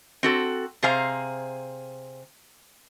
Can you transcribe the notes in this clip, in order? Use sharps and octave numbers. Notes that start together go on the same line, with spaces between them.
C4 F#4 A4
C3 G#4 C5 F5 A#5